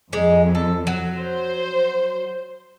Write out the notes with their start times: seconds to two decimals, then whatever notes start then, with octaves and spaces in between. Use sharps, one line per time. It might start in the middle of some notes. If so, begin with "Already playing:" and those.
0.13 F2 G#3 D#4
0.55 A4
0.87 F#3
1.20 C5